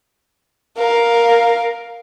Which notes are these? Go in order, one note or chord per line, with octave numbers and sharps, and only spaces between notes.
A#4 F5